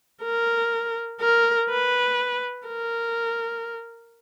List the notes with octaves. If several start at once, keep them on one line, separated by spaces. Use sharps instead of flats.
A#4
A#4
B4
A#4